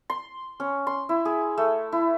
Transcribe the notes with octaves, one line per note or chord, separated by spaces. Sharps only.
C6
C#4
C6
E4
G#4
A3
E4